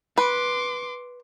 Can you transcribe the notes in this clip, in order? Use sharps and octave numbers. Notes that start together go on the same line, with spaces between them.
B4 C6 D6